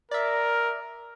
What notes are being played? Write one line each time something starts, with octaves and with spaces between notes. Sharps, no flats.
A#4 D5 E5